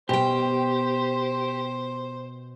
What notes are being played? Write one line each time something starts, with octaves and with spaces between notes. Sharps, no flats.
B2 G4 C5 G5